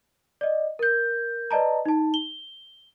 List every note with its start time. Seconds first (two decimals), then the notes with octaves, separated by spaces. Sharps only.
0.41 D5 D#5
0.79 A#4 G6
1.51 B4 D5 D#5 A5 A#5
1.86 D#4 A5
2.14 G7